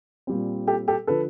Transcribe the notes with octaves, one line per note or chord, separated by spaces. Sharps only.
A#2 G3 C4
G4 A4
G4 A4
D3 F3 A4 B4